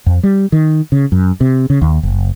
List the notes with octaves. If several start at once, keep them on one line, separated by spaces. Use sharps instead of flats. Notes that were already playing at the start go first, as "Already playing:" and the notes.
F2
G3
D#3
C#3
F#2
C3
C#3
D#2
F#1